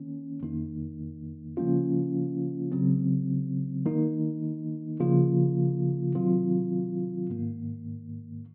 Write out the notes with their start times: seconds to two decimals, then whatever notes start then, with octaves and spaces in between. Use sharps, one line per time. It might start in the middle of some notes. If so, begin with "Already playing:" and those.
Already playing: D#3 A#3 C#4
0.43 F2 D#3 A#3 D#4
1.57 C#3 F3 A#3 C#4 F4
2.72 C#3 F#3 C4
3.86 D#3 A#3 D#4
5.00 C#3 F3 A#3 F4
6.15 C3 D#3 F#3 C4 F4
7.30 G#2 D#3 A#3